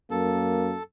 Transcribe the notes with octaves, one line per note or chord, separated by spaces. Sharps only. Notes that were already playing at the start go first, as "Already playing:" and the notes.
F#2 A#3 A4